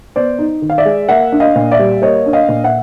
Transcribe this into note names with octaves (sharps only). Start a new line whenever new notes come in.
B3 C5 D5
D#4
D#3
F5
D5 E5
G#3
A#3 E5 F#5
D4
D#5 F5
A#2
D5 E5
G3
A#3 C#5 D#5
D4
D#5 F5
A#2
E5 F#5